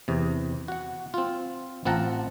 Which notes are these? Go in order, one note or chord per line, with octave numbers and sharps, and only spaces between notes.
E2 C3
F#4 F#5
C4 F4
A1 C4 F4 F#5 A5 A#5